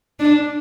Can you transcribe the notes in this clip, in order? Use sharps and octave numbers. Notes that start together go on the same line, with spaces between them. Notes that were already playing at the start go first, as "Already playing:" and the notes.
D4